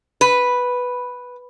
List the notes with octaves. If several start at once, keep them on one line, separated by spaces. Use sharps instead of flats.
B4